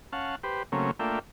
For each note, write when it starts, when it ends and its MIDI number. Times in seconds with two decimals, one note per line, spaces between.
0.13 0.36 61
0.13 0.36 77
0.13 0.36 78
0.13 0.36 81
0.43 0.63 67
0.43 0.63 71
0.43 0.63 72
0.72 0.91 49
0.72 0.91 54
0.72 0.91 57
0.72 0.91 58
0.72 0.91 60
0.72 0.91 61
0.99 1.19 57
0.99 1.19 58
0.99 1.19 62
0.99 1.19 65
0.99 1.19 76
0.99 1.19 79